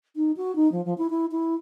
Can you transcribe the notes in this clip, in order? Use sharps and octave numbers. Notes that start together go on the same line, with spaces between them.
D#4
F#4
D#4
F3
F3
E4
E4
E4